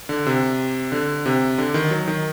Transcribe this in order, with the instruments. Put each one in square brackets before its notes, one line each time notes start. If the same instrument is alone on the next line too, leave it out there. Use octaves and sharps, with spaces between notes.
[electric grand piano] D3
C3
D3
C3
D3
D#3
F#3
D#3